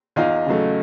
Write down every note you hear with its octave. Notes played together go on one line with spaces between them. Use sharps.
E2 D#4 F4
C#3 F#3 A3